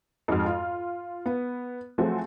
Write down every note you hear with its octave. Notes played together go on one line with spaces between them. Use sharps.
F2 G#2 G#3 F#4 F6
F4
B3
F3 F#3 A3 C4 F#4 G#4